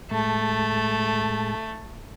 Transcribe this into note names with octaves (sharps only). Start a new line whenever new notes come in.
A2 G#3 A3 A5